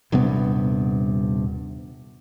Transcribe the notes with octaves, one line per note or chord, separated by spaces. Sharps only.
D#1 G2 C3 B3